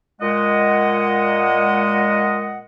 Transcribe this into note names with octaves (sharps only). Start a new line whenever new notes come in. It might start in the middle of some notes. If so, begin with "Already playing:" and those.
A#2 G#3 D#5 F#5